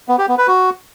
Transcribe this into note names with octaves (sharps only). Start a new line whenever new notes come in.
B3
G4
B3
B4
F#4